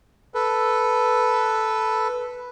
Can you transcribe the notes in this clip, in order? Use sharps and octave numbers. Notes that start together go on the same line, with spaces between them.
A4 B4